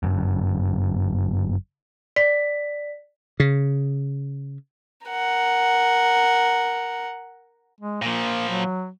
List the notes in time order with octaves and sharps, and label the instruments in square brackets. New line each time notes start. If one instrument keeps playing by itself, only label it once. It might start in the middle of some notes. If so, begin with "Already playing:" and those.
[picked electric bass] G1 F#2
[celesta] D5 B6
[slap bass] C#3
[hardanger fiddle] A#4 F#5
[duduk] G#3
[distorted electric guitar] A#2 F3 [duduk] A#3
[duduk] F#3